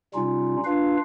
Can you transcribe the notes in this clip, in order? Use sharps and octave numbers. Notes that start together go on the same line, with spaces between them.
C3 G3 C#4 D#4 F4
D4 F4 B4 F5